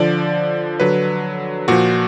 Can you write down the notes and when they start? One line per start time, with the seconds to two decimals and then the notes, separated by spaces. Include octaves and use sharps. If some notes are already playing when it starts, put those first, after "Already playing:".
Already playing: D3 F3 D5
0.80 D3 F#3 B4
1.68 A#2 F3 F#4